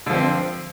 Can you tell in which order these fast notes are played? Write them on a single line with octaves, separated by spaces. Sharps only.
D3 F3 C4